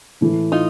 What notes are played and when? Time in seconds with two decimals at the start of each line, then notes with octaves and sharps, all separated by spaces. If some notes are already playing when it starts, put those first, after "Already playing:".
0.21 A2 E3 A3
0.52 D#4 F4